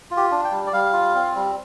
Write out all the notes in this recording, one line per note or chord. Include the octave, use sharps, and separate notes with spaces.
F4
G4
D4
G5
G3
D5
G3 F5
F4
C4
G3